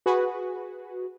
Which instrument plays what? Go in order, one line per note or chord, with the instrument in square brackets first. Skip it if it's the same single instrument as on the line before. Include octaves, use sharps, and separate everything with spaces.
[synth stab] F#4 G#4 B4